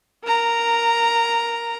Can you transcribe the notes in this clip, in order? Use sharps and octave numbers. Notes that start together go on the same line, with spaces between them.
A#4 A#5